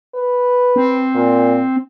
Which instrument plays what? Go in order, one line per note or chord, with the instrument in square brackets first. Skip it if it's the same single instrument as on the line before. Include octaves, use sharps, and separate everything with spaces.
[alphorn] B4
[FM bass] C4
[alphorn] A#2